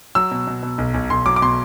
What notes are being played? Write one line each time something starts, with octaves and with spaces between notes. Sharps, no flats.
F#3 E6
B2
B2
B2
B1
B1
B1 C6
F#3 D6
D6
B2 C6